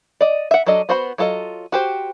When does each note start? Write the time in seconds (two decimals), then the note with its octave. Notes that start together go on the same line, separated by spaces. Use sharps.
0.21 D5 D#5
0.51 E5 F#5
0.66 F#3 D4 A4 D#5
0.89 B3 F#4 C5 F#5 B5
1.18 F#3 F4 A4 A#4 D#5
1.72 F#4 G4 C5